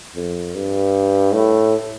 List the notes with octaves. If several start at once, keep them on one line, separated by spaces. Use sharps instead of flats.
F2
G2
A2